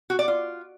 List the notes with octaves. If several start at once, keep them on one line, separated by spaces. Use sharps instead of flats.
F#4
D5
F4